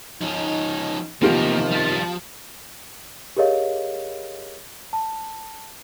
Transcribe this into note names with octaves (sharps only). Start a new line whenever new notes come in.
F3 C#4 D#4
E2 C3 D#3 F3 A#3 B3 F4 G4
G3 A5
G4 G#4 A#4 C#5 D#5 F5
A5